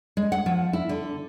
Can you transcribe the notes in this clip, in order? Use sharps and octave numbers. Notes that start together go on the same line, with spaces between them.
G#3
F#5
F3
E4
D3